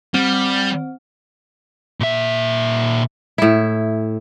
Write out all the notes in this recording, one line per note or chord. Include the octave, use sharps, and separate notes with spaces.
G3 C4
A#2 E5
A2 E4